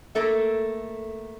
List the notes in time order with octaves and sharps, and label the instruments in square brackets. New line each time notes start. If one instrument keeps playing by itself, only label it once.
[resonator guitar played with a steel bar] A3 A#3 A4 E5